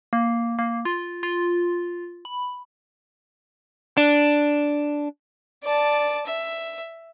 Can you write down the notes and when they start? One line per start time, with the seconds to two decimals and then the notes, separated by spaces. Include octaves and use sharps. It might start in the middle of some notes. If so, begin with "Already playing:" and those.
0.13 A#3
0.59 A#3
0.85 F4
1.23 F4
2.25 B5
3.98 D4
5.64 D5 A5
6.26 E5